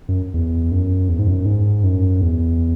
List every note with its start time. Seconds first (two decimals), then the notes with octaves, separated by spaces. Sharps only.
0.08 F#2
0.34 E2
0.71 F#2
1.08 E2
1.19 G#2
1.28 F#2
1.46 G#2
1.84 F#2
2.21 E2